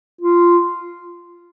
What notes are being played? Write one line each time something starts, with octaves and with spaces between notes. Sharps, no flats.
F4